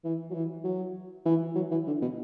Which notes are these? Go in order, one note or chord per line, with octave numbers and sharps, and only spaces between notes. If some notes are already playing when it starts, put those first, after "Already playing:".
E3
F#3
E3
F#3
E3
F#3
E3
D3
B2